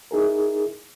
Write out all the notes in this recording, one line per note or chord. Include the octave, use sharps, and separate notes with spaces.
D#4 E4 G#4 A#4